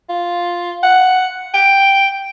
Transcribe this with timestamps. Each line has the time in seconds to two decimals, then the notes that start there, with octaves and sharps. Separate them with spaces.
0.09 F4
0.83 F#5
1.54 G5